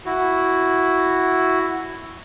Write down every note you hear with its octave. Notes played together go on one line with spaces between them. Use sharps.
E4 F#4